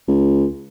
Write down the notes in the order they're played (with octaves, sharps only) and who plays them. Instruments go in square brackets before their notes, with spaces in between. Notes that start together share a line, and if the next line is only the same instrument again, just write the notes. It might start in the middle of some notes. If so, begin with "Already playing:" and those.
[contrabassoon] C#2